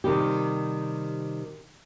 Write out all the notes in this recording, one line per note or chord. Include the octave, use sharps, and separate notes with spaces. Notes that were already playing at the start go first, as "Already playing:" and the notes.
C3 D#3 G3 G4